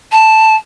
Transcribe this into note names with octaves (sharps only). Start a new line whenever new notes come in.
A5